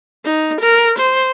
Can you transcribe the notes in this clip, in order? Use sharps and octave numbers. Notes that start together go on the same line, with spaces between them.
D#4
A#4
C5